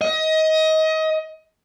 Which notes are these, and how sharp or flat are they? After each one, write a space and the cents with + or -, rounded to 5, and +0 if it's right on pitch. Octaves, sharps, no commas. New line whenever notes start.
D#5 +25